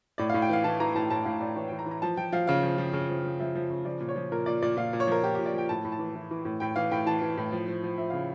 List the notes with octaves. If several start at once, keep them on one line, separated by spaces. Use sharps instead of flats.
A2 D5
A2 F5
G5
E3 F5
E3 A5
E3 A#5
A2 A5
A2 A5
A2 F5
A2 D5
E3 C#5
E3 G5
A#5
E3
A#5
F3 A5
F3 G5
F3 F5
C#3 F5
F3
F3
C#3
F3
F3
F3 E5
F3
C#3
F3 D5
A#2
C#5
F3
A#2 A#4
A#2 D5
A#2 D5
A#2 F5
A#2
C#5
F3 A#4
A#2 G4
A#2 G4
D5
F3 G5
A2 A5
A2
A5
E3
E3
E3
A2
A2 G5
E3 F5
A2 G5
E3 A5
E3
A2
F3
F3
F3
F3 E5
C#3 F5